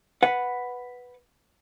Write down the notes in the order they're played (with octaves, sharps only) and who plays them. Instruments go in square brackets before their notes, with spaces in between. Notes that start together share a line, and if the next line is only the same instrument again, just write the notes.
[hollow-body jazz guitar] B4 F#5